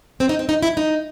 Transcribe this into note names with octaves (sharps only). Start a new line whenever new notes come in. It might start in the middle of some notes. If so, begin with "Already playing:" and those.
C4
D#4
C4
D#4
E4
D#4